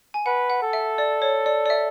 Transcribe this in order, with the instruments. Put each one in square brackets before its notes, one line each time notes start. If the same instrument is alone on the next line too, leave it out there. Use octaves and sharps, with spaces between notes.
[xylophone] G#5
[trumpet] B4 [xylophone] F#5
[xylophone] F#5
[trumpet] A4
[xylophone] E5
D5
C#5
D5
D5
E5